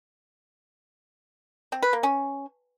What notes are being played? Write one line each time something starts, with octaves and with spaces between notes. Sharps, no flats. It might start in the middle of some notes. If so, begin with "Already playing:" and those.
C4
B4
A#3
C#4